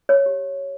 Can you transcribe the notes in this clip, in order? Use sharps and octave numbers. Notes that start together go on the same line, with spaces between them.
C#5
G4